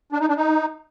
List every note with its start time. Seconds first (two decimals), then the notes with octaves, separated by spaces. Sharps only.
0.12 D4
0.20 D#4
0.28 D4
0.37 D#4